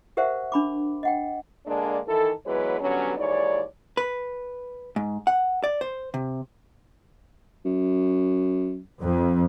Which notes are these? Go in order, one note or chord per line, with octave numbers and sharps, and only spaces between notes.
G4 A#4 C5 E5 F#5
D4 B5 D6
D#5 F#5 G5
D3 G#3 A#3 D4
D#3 E3 E4 A4
E3 F#3 G#3 B3 B4 C#5
D3 F#3 G3 B3 C#4
D#2 G#2 E3 C#5 D5
B4
G#2
F#5
D5
C5
C3
F#2
F2